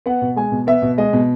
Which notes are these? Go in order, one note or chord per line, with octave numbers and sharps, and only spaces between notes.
B3 F#5
B2
G#3 G#5
B2
B3 E5
B2
G#3 D#5
B2